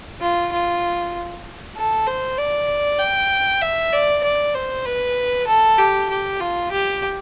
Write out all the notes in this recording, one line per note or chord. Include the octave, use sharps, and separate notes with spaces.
F4
F4
A4
C5
D5
G5
E5
D5
D5
C5
B4
A4
G4
G4
F4
G4